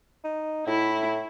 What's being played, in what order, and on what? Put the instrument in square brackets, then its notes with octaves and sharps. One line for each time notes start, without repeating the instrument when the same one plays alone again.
[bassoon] D#4
[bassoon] A2 [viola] E4